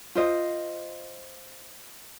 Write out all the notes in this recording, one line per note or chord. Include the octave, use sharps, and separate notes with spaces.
F4 C5 D#5